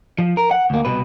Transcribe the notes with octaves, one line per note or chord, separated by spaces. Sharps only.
F3
A#4
F#5
D2 A#3
C2 B2 B4